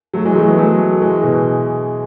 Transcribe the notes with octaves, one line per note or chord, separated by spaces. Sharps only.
F#3 A3
E3 G#3
F#3 A3
G#3 B3
F#3 A3
E3 G#3
B2